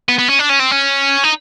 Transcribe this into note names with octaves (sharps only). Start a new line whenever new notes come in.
B3
B3
C#4
D4
C#4
C4
C#4
D#4